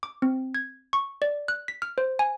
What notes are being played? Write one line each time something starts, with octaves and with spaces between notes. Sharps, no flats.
D6
C4
G#6
C#6
D5
F#6
B6
F6
C5
G#5